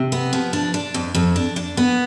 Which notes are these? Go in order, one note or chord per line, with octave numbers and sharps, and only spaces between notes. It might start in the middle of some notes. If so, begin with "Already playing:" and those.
Already playing: C3
B3
F3
D4
D4
F2
F2
D4
D4
B3